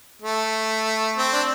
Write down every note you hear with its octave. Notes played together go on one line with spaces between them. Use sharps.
A3
C4
D4